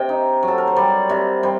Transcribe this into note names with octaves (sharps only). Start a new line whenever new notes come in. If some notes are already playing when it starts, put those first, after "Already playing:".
Already playing: C3 D#5 G5
D#4
F#3
A4
A#4
C5
G3 D5
C3
G3 C5